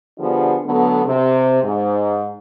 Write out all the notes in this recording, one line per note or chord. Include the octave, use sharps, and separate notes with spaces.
D3 F3 G3 B3 D4 G#4
D3 F#3 A3 B3
C3
G#2